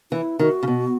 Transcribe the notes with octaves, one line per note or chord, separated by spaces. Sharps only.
E3 E4
D#3 F#4
C#3
B2